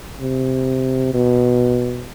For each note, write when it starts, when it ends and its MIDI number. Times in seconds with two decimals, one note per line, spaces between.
0.20 1.12 48
1.14 2.12 47